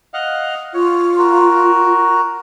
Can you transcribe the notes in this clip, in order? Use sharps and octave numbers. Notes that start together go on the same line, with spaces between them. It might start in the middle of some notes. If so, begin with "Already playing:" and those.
D#5 F5 F#5
F4 C#5
F#4 A#4